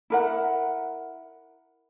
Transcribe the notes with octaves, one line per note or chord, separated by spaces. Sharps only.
E4 A#4 F#5